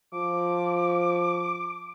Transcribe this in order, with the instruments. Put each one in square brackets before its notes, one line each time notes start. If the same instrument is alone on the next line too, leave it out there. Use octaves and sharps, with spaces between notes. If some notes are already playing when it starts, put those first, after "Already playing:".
[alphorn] F3 [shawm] D6